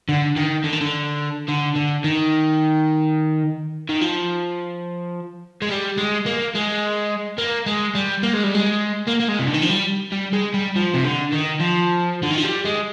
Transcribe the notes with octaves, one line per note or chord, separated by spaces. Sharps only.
D3
D#3
D3
D#3
D3
D3
D3
D#3
D#3
F3
G#3
G3
G#3
A#3
G#3
A#3
G#3
G3
A#3
G#3
G3
G#3
A#3
A#3
G#3
C3
D3
D#3
F3
G3
G3
G#3
G3
F3
C3
D3
D#3
F3
D3
D#3
F3
G3
G#3